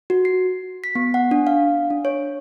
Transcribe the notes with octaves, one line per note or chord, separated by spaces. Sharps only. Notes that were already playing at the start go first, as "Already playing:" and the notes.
F#4
C7
B6
B3
F#5
D4
F5
D4
C#5